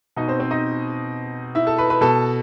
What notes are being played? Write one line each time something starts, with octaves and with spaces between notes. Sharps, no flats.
B2 D#4 D#5
C4 C5
C4 C5
D#4 D#5
E4 E5
A4 A5
B4 B5
B4 B5
B2 A4 A5